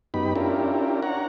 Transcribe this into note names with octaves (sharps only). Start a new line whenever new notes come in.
F#2 B3 D#4 G4 B5
C#4 D4 E4 F4 G4 A#4
D4 C#5 F#5 A#5